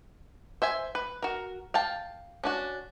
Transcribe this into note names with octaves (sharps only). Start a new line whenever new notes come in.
C5 E5 G#5
B4
F#4 A#4
F5 G5 A5
C#4 D4 F#4